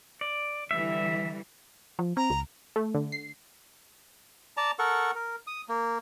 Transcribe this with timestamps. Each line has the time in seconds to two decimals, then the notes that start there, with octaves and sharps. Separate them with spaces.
0.21 D5
0.71 D3 E3 G3 E5
1.99 F3
2.17 C4 A#5
2.30 C#2
2.76 A3
2.95 D3
3.12 C7
4.57 D5 A5 A#5
4.79 A4 A#4 F#5 C#6
5.15 A#4
5.47 D#6
5.69 A#3